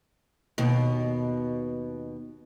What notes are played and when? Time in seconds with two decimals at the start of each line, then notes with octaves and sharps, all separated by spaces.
0.58 D#2 B2